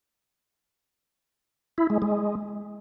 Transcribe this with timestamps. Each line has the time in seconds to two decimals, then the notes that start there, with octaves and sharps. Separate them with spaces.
1.78 E4
1.90 G#3
2.02 G#3